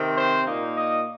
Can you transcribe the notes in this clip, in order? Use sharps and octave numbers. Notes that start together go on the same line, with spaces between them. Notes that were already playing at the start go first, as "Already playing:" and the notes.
Already playing: C3 D#3 C4
C5
A#2 A#3 D#4
D#5